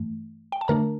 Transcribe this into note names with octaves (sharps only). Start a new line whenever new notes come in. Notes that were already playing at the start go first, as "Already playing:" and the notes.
Already playing: G2 E3 A3
G5
A5
D3 A3 D4 A#4 A#5